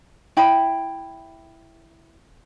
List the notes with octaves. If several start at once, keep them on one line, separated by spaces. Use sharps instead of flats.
E4 G5 B5